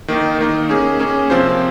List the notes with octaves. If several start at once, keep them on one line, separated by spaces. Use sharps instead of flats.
D#3 A#3 D#4
D#3 A#3 D#4
A#3 C#4 G#4
A#3 C#4 G#4
C3 F3 C4 F4 C5